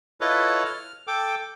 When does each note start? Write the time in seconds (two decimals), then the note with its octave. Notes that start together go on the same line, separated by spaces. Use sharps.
0.21 E4 F4 A4 B4 C#5 D#5
0.65 F6
1.07 A4 G5 D6